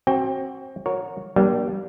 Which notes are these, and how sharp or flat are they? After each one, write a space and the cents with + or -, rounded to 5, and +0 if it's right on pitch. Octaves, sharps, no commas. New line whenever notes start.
C4 +35 F#4 +20 G5 +25
F#4 -20 A#4 +0 C#5 +0
G3 -20 A#3 +30 D4 +0